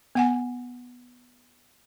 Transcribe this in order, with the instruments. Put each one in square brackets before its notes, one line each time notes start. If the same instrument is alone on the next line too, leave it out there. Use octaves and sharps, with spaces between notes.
[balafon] B3 F#5 G#5